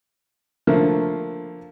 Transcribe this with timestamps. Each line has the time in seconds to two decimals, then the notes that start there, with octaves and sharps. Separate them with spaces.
0.67 D3 F3 A3 A#3